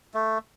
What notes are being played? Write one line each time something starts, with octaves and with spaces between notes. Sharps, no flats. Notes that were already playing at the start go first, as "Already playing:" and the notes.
A3